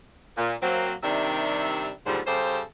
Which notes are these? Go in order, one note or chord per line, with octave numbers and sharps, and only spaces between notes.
A#2
F#3 A#3 C4
C3 D#3 G3 D4 E5
D#2 G#2 D3 F3 G3 C5
C#3 G3 G4 A4 C5